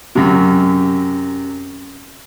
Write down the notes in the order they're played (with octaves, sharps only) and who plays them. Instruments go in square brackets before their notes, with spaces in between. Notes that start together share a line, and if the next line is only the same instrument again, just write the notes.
[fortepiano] F#2 C3